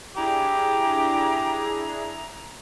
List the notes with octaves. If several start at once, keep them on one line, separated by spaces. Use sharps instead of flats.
D4 E4 G4 G#4 A#5